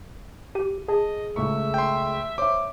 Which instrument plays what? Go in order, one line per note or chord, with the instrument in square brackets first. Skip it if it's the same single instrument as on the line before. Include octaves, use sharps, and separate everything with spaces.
[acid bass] G4 [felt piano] D#7
[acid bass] G#4 [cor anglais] D#5 [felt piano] A5
[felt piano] C#2 A3 C#6 [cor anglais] E5
[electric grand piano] G5 C6
[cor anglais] C5 [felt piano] C#5 E5 [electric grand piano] D6